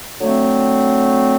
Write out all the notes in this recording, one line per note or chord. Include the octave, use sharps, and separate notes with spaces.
D3 F#3 A3 C4